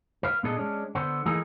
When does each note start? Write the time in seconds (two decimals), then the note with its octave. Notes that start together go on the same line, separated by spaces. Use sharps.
0.23 B4 F5
0.43 A#2 B3 D4 G#4 A4 D#5
0.56 G#3 C#4 D4
0.95 D3 B3 C5
1.25 E3 A3 A#3 D#4 G#4